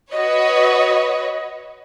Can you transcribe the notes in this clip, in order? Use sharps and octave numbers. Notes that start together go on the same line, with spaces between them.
F#4 B4 C#5 D#5